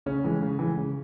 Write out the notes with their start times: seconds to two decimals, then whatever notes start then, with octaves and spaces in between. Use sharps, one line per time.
0.06 C#3 C#4
0.24 E3 G#3
0.42 C#3
0.59 E3 G#3
0.78 C#3